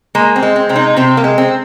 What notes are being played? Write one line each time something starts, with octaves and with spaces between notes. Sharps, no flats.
G#3 A#3
C4
G#3
C4
C3 C4
D#4
C3 C4
A#3
G#3
C4